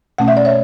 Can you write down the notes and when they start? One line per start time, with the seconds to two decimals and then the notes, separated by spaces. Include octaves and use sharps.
0.18 B2 A3 C#4 F#5
0.28 E5
0.37 D5
0.45 C#5 E5